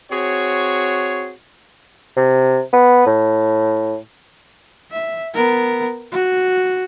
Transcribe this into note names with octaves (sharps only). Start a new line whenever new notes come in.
C4 F#4 G#4 C#5
C3
B3
A2
E5
B3 A#4
F#4